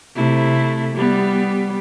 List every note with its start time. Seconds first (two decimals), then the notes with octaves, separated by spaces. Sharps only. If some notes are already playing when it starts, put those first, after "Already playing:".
0.16 C3 A3 E4
0.95 G3 B3